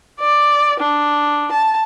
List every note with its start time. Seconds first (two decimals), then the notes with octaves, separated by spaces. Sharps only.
0.20 D5
0.80 D4
1.52 A5